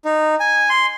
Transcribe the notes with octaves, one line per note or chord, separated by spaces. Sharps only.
D#4
G#5
C6